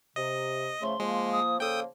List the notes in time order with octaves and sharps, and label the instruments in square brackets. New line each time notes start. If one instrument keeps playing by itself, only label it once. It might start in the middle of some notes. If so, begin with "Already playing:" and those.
[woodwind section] C3 [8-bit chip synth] D#5
[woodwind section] C#3 F3 A3 [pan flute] C6
[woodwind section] F3 A#3 [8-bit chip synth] G#3
[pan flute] D#6
[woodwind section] C#3 F3 A#3 [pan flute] A4 [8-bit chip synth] G5 D#6